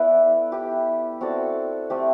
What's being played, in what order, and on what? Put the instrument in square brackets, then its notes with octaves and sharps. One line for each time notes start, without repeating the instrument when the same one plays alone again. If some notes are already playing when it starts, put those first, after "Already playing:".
Already playing: [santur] B3 E4 A4 B4 D5
E4 G4 B4
C4 F#4 A4 D5
A3 C4 G4